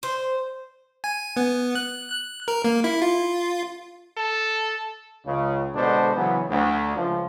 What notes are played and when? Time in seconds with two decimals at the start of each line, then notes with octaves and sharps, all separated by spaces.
0.03 C5
1.04 G#5
1.36 B3
1.75 F#6
2.12 F#6
2.48 A#4
2.64 A#3
2.84 E4
3.02 F4
4.17 A4
5.25 C#2 C#3
5.75 B2 D3 G#3 D4 A4 C5
6.15 C#3 E3 F#3 B3
6.49 D2
6.96 C#2 F3